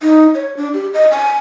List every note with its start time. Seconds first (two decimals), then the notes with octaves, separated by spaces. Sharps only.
0.02 D#4
0.35 C#5
0.57 D4
0.74 G4
0.94 D#5
1.11 G#5